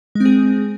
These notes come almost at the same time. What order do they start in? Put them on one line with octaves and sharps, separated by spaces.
G#3 C4 G#4